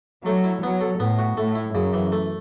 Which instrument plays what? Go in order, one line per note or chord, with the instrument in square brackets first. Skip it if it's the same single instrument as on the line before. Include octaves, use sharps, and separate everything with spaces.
[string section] F#3 [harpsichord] A3
[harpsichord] E4
[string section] F#3 [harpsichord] B3
[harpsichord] A4
[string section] A2 [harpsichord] B3
[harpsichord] F#4
[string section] A2 [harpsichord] A3
[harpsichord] E4
[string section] F#2 [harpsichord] C#3
[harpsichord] E3
A3